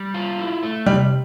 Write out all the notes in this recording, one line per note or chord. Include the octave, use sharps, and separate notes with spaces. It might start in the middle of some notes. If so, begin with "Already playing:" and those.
Already playing: G3
F4
E4
A3
C3 G3